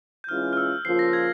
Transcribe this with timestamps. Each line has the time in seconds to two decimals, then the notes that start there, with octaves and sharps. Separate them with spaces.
0.24 G6
0.29 E3 G#3 C#4 F4 F6
0.53 F6
0.57 E6
0.85 C#3 F3 A#3 F4 C7
0.99 A#6
1.13 G#6